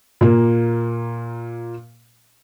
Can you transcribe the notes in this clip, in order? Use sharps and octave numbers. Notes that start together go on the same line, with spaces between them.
A#2 A#3